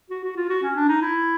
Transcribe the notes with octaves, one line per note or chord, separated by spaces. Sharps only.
F#4
F#4
F4
F#4
C#4
D4
D#4
E4